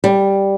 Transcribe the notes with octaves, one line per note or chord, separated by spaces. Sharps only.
G3